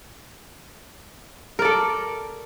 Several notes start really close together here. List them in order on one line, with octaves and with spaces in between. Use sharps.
A#4 D5 A4